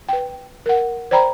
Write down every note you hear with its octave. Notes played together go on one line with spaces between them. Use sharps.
B4 G5
A#4 F#5
C5 D5 G5 A#5 B5